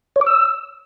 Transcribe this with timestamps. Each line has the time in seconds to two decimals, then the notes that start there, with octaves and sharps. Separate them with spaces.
0.16 C#5
0.21 D6
0.27 E6